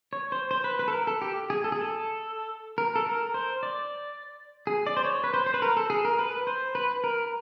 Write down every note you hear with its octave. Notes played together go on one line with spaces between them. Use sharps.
C#5
C5
C5
B4
B4
A4
A#4
A4
G4
G#4
A4
G#4
A4
A#4
A4
A#4
C5
D5
G#4
D5
C5
C#5
B4
C5
C5
B4
A#4
A4
G#4
A#4
B4
C5
B4
A#4